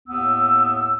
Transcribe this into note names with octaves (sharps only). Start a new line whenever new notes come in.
D#2 A2 B3 E6